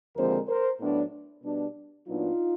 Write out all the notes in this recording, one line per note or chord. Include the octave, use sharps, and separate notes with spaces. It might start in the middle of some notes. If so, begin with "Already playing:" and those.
D#2 D3 F3 G#3 C4 A#4 C5
A#4 C5
A2 F#3 B3 D4
B2 G3 B3 D4
A#2 F#3 B3 D4 D#4 F4